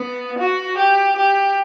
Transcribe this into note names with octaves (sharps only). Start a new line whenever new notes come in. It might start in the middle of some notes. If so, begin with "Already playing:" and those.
Already playing: B3
F#4
G4
G4